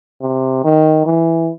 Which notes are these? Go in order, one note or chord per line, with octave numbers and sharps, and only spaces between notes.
C3
D#3
E3